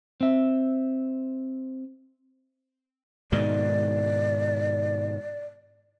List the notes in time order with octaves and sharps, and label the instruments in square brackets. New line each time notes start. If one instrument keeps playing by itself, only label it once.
[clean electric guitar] C4 E5
[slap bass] G#2 B2 D#3 [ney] D5